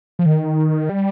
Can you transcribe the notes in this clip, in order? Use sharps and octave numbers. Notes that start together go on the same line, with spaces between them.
F3
D#3
G3